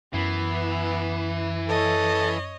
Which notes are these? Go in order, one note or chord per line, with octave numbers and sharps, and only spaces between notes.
F#2 E3 B3 C7
A4 C#5 D#5